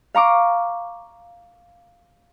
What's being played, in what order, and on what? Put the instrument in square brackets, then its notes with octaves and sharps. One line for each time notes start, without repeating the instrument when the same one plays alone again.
[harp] F5 A#5 C#6 D6